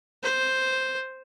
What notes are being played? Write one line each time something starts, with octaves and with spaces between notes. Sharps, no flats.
C5